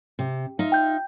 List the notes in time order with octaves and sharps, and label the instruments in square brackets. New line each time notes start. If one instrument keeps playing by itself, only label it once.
[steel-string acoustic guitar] C3
D#4 F4 E5
[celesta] G5 G6